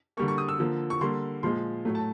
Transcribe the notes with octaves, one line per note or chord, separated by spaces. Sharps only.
D3 G3 A#3 C#6
C#6
D#6
E6
D3 F3 A#3
C#6
D3 G3 A#3 C6
A#2 F3 G#3 C6
A2 F#3 A3
A5